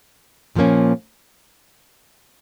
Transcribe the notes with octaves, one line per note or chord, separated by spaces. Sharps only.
A#2 F3 A#3 C#4